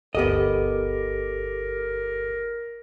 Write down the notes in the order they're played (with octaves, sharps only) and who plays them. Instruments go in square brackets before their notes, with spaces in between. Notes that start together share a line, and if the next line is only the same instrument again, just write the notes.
[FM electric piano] G1 D2 D6 [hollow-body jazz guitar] B3 D#5 [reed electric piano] G4 A4 [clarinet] A#4